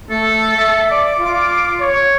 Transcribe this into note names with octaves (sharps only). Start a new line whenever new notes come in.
A3 A4
E5
D5 D6
F4
C#5